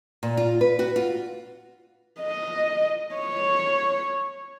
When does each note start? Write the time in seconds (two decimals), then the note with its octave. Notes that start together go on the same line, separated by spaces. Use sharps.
0.23 A#2
0.37 F4
0.61 B4
0.79 F#4
0.96 F4
2.21 D#5
3.15 C#5